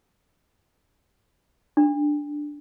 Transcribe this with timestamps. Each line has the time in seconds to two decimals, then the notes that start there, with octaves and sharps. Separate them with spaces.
1.77 D4